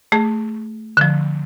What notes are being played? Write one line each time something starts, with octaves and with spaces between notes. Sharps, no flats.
A3 G#4
D3 F3